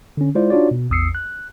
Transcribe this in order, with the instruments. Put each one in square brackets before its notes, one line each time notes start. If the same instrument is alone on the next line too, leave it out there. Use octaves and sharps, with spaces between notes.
[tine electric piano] D3 C#4
G#3 E4 F4 C5 D5
D4 D#4 F4 F#4 C#5 D5
B2
A1 E2 D#6 E6 C7 C#7
F#6